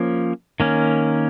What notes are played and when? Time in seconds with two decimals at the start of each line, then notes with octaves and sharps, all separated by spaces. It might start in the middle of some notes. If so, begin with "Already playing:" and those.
Already playing: F3 A#3 C#4
0.60 D#3 A#3 C#4